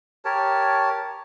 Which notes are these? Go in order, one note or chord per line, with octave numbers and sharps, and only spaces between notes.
G4 A#4 C#5 A5